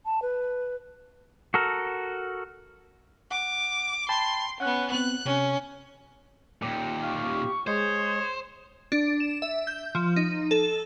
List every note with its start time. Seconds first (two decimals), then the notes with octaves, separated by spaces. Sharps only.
0.05 A5
0.22 B4
1.54 F#4 A4 A#4
3.31 F#5 D6
4.09 G5 A5 B5 C6
4.60 B3 C#4 F#5 F#6
4.92 B3 C4 F#6
5.25 C3 C#4
6.62 D#2 A#2 G4 C#7
7.03 F5 C#6
7.67 G#3 C5 C#5 D#6
8.92 D4
9.20 E7
9.42 E5
9.67 G6
9.95 F3
10.16 D#4
10.51 A4